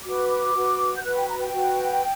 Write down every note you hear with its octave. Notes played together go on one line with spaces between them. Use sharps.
F#4 B4 D6
D6
F#4 B4
G6
F#4 B4 F#6
G5
A#5
G5
F#4 B4